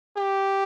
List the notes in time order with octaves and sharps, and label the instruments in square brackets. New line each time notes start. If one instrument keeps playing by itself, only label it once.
[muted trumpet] G4